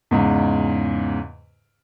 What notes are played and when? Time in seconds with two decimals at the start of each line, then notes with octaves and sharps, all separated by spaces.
0.11 E2 G#2 C#3